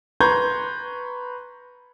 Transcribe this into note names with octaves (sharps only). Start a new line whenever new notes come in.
B4 A#5 C6 C#6 G6 G#6